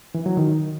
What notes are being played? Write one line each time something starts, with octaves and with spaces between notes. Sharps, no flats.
E3
F#3
D#3